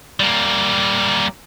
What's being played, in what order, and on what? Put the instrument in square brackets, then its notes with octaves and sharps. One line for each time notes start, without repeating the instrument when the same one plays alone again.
[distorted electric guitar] G3 A#3